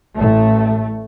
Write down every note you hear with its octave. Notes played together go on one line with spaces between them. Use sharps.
A1 A2 A3